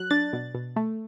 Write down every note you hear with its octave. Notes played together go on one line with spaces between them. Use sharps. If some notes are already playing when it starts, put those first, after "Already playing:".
Already playing: F#3 F#6
D4 A6
B2
B2
A3